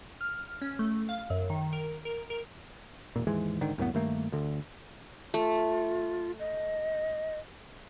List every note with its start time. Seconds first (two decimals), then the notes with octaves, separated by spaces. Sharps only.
0.21 F6
0.62 C#4
0.79 A3
1.09 F5
1.30 F#2
1.50 D#3
1.73 A#4
2.05 A#4
2.30 A#4
3.16 E1 A#2
3.27 D#2 G#2 E3 G#3
3.61 G#2 D3 D#3
3.78 C2 F#2 A2 B3
3.94 G2 D#3 A3 A#3
4.32 D2 D3
5.34 A3 F4
6.39 D#5